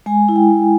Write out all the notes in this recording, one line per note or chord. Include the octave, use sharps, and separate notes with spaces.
G#3 G#5
E4
G5
G#3